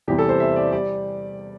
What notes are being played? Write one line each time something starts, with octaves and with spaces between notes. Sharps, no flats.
E2 C3 E3 G3 G4
A4
C5
E5
D5
G3 D5